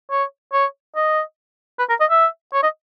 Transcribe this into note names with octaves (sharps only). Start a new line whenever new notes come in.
C#5
C#5
D#5
B4
A#4
D#5
E5
C#5
D#5